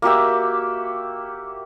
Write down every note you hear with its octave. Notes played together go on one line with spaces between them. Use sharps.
A#3 F#4 G4 E5